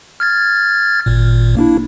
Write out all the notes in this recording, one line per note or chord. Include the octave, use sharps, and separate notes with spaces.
F6 G#6 A6
G#1 A#2
A#3 D4 E4